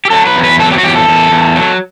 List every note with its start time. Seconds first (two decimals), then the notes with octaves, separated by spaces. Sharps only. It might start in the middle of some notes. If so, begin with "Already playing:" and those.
0.05 G4
0.10 F#3 A4
0.27 B4
0.36 E2
0.44 B4
0.59 F#3 A4
0.72 G4
0.78 F#4
0.83 E2 G4
0.95 A4
1.08 E2
1.32 E2
1.56 F#3